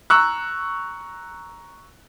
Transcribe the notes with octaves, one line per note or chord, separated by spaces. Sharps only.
A#5 C#6 E6 F#6